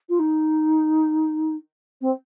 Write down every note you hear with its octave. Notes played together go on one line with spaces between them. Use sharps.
F4
D#4
C4